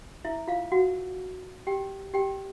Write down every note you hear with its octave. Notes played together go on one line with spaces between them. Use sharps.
E4 E5
F4 F5
F#4 F#5
G4 G5
G4 G5